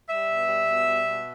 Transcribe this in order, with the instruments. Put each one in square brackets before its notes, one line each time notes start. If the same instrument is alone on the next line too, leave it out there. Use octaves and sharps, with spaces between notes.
[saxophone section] G3 E5
B2
G3
B2
G3
B2